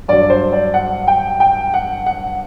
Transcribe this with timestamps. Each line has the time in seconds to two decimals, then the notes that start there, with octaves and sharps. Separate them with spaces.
0.08 G2 F#3 D5
0.30 C5
0.53 D5
0.74 F#5
1.08 G5
1.40 G5
1.74 F#5
2.06 F#5